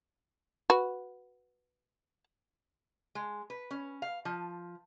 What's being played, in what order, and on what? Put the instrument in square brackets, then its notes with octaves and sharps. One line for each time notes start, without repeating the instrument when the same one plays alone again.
[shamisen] F#4 B4
[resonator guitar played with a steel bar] G#3
B4
C#4
F5
F3